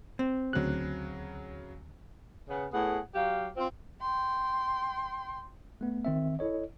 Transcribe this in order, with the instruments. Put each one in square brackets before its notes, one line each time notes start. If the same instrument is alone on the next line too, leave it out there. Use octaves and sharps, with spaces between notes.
[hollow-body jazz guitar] C4
[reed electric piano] D2 F#6 [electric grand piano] C#3 F#3
[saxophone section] C#3 B3
A2 B3 G#4 F#5
F#3 G4 F5
C4 F4
[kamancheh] G5 C6
[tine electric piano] A3 B3
D#3 C4 E5
E4 A4 C#5 D#5